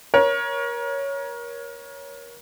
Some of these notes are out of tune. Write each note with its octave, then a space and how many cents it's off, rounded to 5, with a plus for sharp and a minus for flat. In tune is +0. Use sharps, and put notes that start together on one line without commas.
A#4 +30 C#5 +0